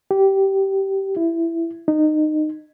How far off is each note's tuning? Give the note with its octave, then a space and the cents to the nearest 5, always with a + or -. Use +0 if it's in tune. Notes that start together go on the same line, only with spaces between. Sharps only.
G4 -15
E4 +15
D#4 -20